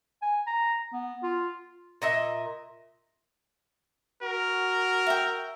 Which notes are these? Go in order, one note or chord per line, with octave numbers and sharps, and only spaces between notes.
G#5
A#5
B3
F4
A#2 D#5 E5
F#4 A#4
E5 G5